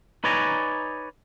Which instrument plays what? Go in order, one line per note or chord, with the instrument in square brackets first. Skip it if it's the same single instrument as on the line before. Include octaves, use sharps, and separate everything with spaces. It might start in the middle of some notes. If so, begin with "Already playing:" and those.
[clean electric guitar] D#4 B4 C#5 D5 G#5 A#5